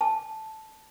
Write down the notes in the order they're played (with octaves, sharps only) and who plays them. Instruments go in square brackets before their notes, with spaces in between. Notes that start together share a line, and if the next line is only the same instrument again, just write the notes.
[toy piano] A5